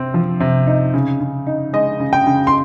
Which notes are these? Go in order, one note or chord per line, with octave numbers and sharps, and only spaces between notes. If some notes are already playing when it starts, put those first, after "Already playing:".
Already playing: C3 C4
F3
C3
D#4
C#3
C#3
D#4
G#3 D#5
C#3
G5
C#3
C6